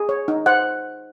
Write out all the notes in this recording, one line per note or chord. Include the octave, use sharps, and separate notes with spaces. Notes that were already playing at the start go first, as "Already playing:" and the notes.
Already playing: G#4
C#5
D#4
C5 F#5